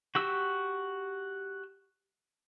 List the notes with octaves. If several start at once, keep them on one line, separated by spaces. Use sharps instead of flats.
F#4 G4 E6